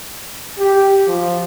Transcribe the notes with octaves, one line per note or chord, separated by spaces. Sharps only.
G4
F3